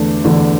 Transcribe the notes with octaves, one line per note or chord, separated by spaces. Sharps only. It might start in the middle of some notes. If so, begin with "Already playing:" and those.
Already playing: E2 D3 A3 D4
E2 D3 A3 D4